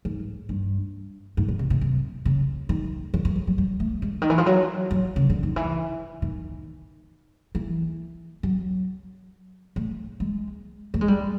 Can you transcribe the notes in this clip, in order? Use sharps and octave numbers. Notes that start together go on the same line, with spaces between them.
G#2
G2
G#2
A#2
C3
C3
C3
C#3
D#3
E3
F3
F3
F#3
G3
A3
G#3
D3
D#3
E3
F3
F#3
F#3
C#3
D3
D#3
E3
D#3
E3
F#3
A3
G#3
A3
G#3
G3